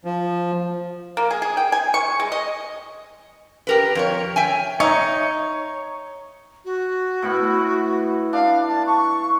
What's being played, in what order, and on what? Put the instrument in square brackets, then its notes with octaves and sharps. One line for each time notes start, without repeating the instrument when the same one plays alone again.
[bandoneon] F3
[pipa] A#3
G#4
G#4
G5
G#5
C#6
G#3
D#5
[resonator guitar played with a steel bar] G4 A#4 B4
F2 A#4 C#5
E5 G5 G#5
[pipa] D#4 [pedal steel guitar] C#5 [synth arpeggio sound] E5
[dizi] F#4
[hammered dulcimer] A2 B3 B5
[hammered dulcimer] D4 [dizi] F5
[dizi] A5
C#6